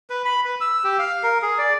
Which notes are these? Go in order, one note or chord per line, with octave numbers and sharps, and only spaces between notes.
B4
B5
B4
E6
G4
F5
A#4
G#4
D5